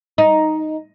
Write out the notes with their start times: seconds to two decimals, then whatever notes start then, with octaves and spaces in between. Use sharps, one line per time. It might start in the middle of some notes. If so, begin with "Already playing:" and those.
0.18 D#4